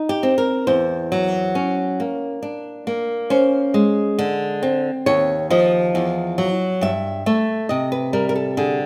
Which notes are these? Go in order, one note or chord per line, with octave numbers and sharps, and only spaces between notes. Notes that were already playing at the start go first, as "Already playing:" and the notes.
Already playing: D#4
G4
C4
A#4
E2 C5
F#3
C#4
A#3
D4
A#3
C#4 C5
G#3
D3
C4
D#2 C#5
F3 D#5
E2
F#3
G2 E5
A3 E5
C3 D#5
B4
G3 A#4
A#4
A4
D3 G#4